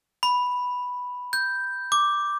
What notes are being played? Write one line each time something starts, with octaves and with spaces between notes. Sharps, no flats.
B5
G6
D6